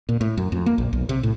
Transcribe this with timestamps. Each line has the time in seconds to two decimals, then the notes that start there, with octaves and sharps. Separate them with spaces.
0.09 A#2
0.21 A2
0.37 F#2
0.52 F2
0.66 A#3
0.78 A#1
0.93 B1
1.09 C3
1.23 A2